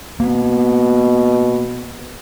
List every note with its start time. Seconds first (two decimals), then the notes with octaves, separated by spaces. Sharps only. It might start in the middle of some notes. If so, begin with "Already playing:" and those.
0.20 B2 A#3 B3